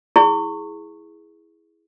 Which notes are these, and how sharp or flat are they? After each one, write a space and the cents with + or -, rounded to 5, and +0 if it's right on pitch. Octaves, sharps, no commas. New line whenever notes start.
E4 -5 G#4 +0 C#6 -15